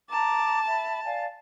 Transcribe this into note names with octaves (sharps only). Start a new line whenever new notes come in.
A5 A#5 D6
E5 B5
D5 F5 G#5